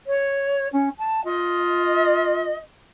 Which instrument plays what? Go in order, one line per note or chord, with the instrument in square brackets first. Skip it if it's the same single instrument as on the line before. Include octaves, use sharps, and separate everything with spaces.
[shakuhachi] C#5
C#4
A5
[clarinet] F4 [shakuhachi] D#5